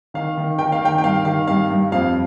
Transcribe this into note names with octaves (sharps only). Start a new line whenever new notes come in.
D#3 F5
D#3
D#3 G5
F5
D#3 G5
G5
G2 F5
D#3 F5
G2 F5
G2
F2 F5